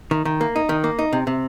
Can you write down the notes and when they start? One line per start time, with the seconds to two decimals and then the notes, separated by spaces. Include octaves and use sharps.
0.11 D#3
0.25 D#3
0.41 A#3
0.56 D#4
0.69 D#3
0.84 A#3
0.99 D#4
1.13 C3
1.27 C3